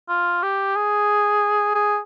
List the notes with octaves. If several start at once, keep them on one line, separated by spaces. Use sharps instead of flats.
F4
G4
G#4
G#4